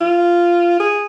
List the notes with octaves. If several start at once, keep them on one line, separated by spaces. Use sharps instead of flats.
F4
G#4